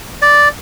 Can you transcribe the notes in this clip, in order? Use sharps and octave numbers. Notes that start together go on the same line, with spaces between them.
D5